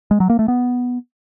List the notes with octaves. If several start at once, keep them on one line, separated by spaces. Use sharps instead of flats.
G#3
F#3
A#3
A3
B3